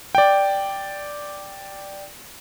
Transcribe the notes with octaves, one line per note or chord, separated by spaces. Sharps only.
D5 G5